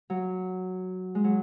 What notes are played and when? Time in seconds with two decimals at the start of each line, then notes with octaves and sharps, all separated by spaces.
0.10 F#3
1.15 G#3
1.24 F#3